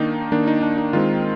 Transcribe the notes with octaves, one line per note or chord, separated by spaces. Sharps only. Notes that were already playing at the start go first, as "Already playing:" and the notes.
Already playing: D#3 A#3 D4 D#4
D#3 A#3 D4
D#4
D4
D#4
D#3 G#3 C4 F4